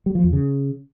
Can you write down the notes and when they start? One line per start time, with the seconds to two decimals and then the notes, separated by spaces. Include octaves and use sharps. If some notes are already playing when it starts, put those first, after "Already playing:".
0.06 G3
0.15 F3
0.24 E2
0.33 C#3